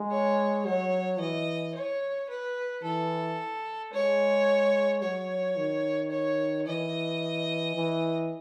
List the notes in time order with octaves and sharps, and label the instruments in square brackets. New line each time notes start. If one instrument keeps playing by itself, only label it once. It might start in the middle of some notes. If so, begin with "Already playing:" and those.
Already playing: [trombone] G#3
[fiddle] C#5
[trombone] F#3 [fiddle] C#5
[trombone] E3 [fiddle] D#5
[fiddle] C#5
B4
[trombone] E3 [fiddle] A4
[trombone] G#3 [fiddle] C#5
[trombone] F#3 [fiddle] C#5
[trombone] D#3
[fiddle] C#5
[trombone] E3 [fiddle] D#5
[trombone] E3